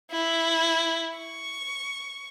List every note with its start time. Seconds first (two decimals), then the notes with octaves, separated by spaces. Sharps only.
0.11 E4
1.18 C#6